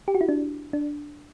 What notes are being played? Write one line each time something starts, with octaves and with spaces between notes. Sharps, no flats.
G4
F#4
E4
D4
D4